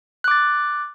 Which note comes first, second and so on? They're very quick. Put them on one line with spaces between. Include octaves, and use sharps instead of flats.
F#6 D6 A6